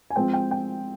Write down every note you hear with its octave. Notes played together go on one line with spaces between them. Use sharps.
G#5
F3 G#3 C4 G5
G5
G5